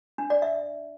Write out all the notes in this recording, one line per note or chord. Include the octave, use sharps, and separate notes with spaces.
D4
D5
E5